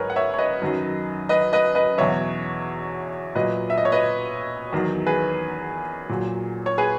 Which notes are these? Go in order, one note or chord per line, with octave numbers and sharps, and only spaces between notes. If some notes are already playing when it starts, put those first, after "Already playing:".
Already playing: G#2 F#3 A#4 B4 C#5 G#5
F#5
C#5 E5
C#5
B4 D#5
F#2 D#3 F#3
B4 D#5
B4 D#5
B4 D#5
E2 B2 F#3 C#5 E5
A#2 F#3 B4 D#5
E5
D#5
C#5
B4 D#5
E2 D#3 F#3
G#4 B4
A#2 F#3
C#5
G#4 B4